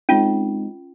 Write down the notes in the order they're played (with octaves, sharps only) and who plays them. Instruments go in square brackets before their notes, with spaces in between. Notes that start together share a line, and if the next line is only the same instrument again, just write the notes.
[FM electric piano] G#3 C4 D#4 [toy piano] C#4 F4